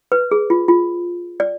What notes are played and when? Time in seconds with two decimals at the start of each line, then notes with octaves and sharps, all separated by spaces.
0.12 B4
0.31 G#4
0.50 F4
0.68 F4
1.40 D5